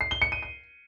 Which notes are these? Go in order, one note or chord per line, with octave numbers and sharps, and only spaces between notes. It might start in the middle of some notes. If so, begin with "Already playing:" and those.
C7
G7
C#7
D#7
D#7